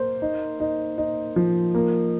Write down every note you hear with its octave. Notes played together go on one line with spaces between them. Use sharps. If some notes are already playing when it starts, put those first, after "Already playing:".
Already playing: A#3 C5
D#4
D#4
D#4
F3
A#3